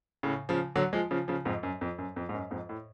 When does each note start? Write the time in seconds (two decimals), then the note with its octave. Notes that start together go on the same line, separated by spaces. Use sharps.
0.23 A2 C#3
0.49 C#3 F3
0.76 D3 F#3
0.93 F3 G#3
1.11 C#3 F3
1.28 C#3 F3
1.45 F2 G#2
1.63 F#2
1.81 F2
1.98 F#2
2.16 F2
2.29 G#2
2.34 F#2
2.51 F2 G#2
2.69 A2